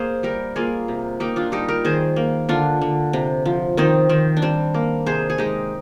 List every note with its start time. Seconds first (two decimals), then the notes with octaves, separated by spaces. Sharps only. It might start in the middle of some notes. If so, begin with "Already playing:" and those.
Already playing: A#3 G#4 C5
0.23 G3 G4 A#4
0.56 A#3 F4 G#4
0.88 C3
1.20 A#3 D#4 G4
1.36 D4 F4
1.52 G3 D#4 G4
1.68 G4 A#4
1.85 D#3 G#4 C5
2.16 A#3
2.49 D3 D4 F4
2.81 D3
3.13 C3
3.45 F3
3.77 D#3 C4 D#4
4.09 D#3 C4
4.37 D4
4.42 G3 C4
4.74 A#3
5.06 C3 G#4 C5
5.30 G#4
5.38 G#3 D#4 G4